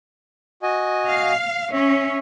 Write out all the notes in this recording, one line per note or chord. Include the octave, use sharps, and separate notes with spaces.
F#4 D#5 G#5
F5
C#4 C#5 E5